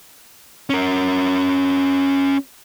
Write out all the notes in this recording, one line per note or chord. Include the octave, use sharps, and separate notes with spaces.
C#4 A#4